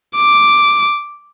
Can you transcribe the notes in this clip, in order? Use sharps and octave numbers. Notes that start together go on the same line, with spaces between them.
D6